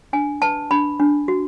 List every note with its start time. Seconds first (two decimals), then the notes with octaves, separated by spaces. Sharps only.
0.13 D4 G#5
0.42 B4 A5
0.71 D4 B5
1.00 D4
1.28 F#4